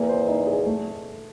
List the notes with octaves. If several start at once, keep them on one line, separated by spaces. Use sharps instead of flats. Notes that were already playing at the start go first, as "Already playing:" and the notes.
Already playing: E2 A#3
C5
D#4
G#4
A3